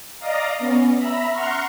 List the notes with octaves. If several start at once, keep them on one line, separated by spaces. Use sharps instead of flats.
D5 D#5 F5 A#5
B3 C#4
E5 A#5 B5
F#5 A#5 C6 C#6 F6